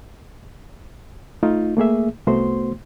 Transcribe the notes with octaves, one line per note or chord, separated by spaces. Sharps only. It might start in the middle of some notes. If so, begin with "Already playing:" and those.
A3 D#4 F4
A3 A#3 G#4 E5
C2 A3 B3 F#4 C5 C6